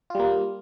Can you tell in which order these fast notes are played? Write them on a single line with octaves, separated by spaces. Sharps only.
F4 G3 A#3